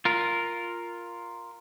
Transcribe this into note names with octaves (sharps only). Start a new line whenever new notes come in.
F4 A#4